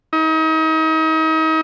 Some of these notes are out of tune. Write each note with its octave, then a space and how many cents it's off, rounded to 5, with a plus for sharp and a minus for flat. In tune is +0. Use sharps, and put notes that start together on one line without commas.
D#4 +35